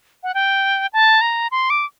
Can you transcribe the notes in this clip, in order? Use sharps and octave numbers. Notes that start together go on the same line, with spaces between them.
F#5
G5
A5
A#5
C6
D6